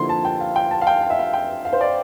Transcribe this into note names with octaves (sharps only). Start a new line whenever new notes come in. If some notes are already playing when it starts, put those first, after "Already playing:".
Already playing: D3 F3 A#3 E4 C6
A5
G5
F5
G5
A5
F5
G5
F5
E5
F5
G5
F5
C5
D5